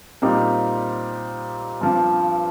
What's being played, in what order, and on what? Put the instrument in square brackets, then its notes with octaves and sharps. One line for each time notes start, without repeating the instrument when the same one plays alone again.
[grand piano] A#2 G3 C4 D#4
G2 F3 C4